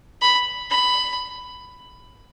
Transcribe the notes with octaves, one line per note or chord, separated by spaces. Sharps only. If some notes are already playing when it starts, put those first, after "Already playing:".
B5
B5